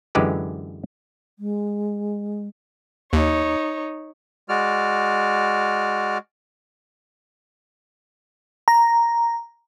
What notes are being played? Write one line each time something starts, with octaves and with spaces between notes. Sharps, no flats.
F#2 D3 E3 G#3 G4 B4
G#3
D#2 D#4 C#5
G#3 F#4 D5 F6
A#5